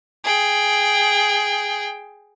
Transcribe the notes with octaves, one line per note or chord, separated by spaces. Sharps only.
G#4 G5